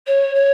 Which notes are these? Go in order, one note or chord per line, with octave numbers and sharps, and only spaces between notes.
C#5
C#5